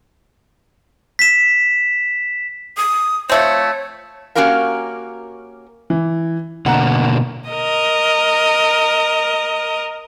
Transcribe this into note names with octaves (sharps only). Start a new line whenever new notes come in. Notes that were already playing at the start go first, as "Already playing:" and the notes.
B6 E7
D#6
F3 A3 C4 C#5
A#3 C#4 F#4 G4 A#4 F5
E3
B2 D3 A#3 F#5 A#5
A#4 D#5